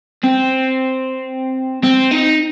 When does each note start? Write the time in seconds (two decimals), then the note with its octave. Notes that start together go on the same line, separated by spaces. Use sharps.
0.24 C4
1.83 C4
2.11 D#4